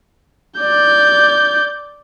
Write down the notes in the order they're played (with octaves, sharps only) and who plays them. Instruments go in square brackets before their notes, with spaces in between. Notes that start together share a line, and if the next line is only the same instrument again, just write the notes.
[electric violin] D5 G6